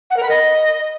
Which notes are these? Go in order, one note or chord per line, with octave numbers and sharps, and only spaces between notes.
F#5
A#4
B5
D#5